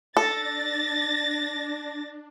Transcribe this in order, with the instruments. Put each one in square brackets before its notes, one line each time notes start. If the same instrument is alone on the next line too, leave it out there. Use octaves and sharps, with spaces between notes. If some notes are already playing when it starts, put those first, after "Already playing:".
[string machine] D4 [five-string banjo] A4 [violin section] A6 A#6